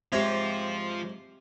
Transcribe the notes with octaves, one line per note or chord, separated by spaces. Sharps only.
G#2 F3 G#3 C4 F4 G4 C#5 E5